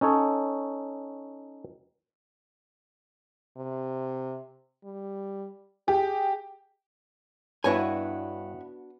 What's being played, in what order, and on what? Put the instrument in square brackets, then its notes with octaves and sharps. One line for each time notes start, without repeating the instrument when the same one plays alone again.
[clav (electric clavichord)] C#4 D#4 A4 C#5
[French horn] C3
G3
[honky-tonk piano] G4 [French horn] G#4
[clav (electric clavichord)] G2 [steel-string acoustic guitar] B3 [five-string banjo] D4 F#4 B4 [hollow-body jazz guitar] E4 C#5 G#5